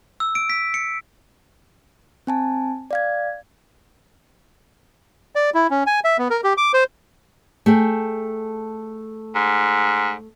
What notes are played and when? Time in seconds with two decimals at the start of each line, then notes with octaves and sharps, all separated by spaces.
0.20 E6
0.35 D7
0.50 B6
0.74 C#7
2.27 C4 G#5 A5
2.91 D5 F5 G#6
5.35 D5
5.54 E4
5.70 C#4
5.86 G#5
6.04 E5
6.18 B3
6.30 A#4
6.44 G4
6.57 D6
6.73 C5
7.66 A3 G#4 G5
9.35 G#2